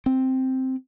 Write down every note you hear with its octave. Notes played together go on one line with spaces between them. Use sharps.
C4